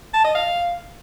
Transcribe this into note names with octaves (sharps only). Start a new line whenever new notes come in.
A5
D#5
F5